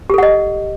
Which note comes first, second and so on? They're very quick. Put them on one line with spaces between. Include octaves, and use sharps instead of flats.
G4 A4 F#5 D#5